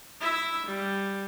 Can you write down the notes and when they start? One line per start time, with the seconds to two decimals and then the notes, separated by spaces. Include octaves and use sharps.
0.21 E4 E5
0.67 G3